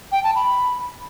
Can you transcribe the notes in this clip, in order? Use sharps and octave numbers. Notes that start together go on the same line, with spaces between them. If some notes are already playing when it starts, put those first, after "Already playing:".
G5
A5
B5